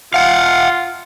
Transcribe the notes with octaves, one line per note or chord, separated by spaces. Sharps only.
F4 F5 F#5